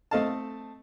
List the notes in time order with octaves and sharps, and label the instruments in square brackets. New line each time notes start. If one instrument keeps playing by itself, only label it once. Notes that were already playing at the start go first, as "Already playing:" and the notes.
[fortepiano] A3 C4 A4 D#5 F5 A5